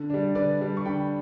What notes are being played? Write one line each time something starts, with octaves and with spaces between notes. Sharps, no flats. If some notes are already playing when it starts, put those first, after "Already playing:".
Already playing: D3
G3 D4
D3 B4 D5
G3 D4
C#6
D3 G5 B5